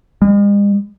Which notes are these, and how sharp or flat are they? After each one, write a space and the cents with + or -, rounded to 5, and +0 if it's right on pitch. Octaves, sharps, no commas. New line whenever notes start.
G#3 -45